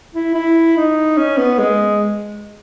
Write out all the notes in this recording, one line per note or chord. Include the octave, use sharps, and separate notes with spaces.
E4
E4
D#4
C#4
B3
G#3